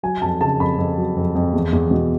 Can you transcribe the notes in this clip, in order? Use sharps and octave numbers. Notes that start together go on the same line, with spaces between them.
F#3 G#5
F2 A5
C#3 A5
F2 B5
F2
F#3
F2
F2
E2
E2
B2